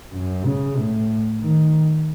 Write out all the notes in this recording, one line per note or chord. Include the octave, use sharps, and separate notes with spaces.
F#2
C#3
A2
D#3